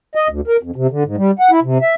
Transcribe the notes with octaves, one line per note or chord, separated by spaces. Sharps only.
D#5
D2
A#4
F2
C3
D3
G#2
G3
F#5
E4
C3
E5